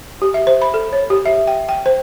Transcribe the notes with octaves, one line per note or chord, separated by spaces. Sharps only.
G4
E5
C5
B5
A4
C#5
G4
E5
G5
G5
C5